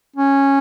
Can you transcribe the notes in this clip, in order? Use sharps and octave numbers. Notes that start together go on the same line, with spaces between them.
C#4